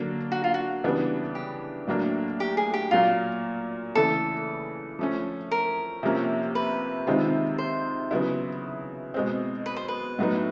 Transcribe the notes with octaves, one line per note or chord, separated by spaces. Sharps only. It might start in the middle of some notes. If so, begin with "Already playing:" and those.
Already playing: D3 F#3 A#3 D4
F#4
F4
F#4
C#3 E3 G3 B3 D4
G4
A2 F#3 A#3 D4
G4
G#4
G4
A#2 F#3 A#3 F4
C#3 E3 A3 A4
F3 A3 C#4
A#4
C3 F3 A#3 C#4
B4
C3 D#3 G#3 C4 F4
C5
C#3 F#3 B3 E4
B2 G#3 C4
B4
C5
B4
A2 F#3 B3 D#4